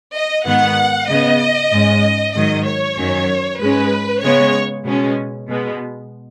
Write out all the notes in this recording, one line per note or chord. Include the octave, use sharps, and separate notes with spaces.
D#5
G#2 D#3 B3 F#5
C#3 B3 D#5
G#2 G#3 C#4
G#2 D#3 F#3 D#5
C#5
F#2 D#3 F#3 C#4
G#2 G#3 C#4 B4
C#3 G#3 B3 C#5
B2 G#3 C#4
B2 G#3 B3